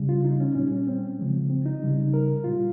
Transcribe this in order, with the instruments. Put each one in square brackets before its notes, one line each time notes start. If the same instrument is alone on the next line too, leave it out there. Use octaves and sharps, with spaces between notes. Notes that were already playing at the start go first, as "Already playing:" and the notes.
Already playing: [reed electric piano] C#3 G3
F4
D#4
C#4
A#2 G3 C#4
C#4
C4
C#3 F3 G#3
C4
D#4
C#3 G3
A#4
A#2 G3 F4